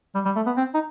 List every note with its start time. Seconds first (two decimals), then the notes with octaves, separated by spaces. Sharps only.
0.15 G3
0.25 G3
0.36 A3
0.46 B3
0.57 C4
0.74 D#4